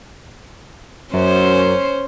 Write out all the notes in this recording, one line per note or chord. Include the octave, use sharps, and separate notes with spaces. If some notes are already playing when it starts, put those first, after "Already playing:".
F#2 C#4 C5